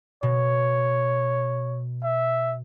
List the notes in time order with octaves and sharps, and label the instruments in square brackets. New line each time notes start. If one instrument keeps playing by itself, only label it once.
[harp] B2 [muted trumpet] C#5
[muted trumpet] E5